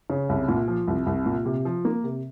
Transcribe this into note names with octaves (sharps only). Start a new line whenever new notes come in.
C#3
C2
A#2
F3
C2
C2
A#2
C3
F3
A#3
C3